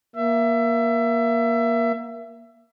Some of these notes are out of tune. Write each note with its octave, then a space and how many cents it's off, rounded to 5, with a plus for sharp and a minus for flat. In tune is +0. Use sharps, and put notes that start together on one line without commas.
A#3 +20 E5 +25